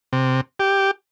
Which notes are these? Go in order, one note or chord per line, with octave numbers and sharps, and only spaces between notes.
C3
G4